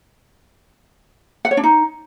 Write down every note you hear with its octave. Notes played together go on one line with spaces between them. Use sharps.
F#5
C#5
D4
D#4